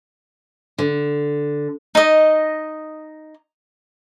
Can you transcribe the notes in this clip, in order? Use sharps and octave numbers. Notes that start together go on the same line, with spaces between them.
D3
D#4 D#5